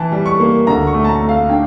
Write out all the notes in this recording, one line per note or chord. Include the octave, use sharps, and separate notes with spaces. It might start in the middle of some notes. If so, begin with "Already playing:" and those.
Already playing: E3 A5
G3
C#6
A#3
D2 A#5
C#6
A3
A5
A#5
A3
F5
D4 G5